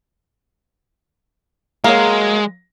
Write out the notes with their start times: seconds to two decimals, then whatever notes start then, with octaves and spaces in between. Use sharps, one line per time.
1.84 F#3 G#3 A#3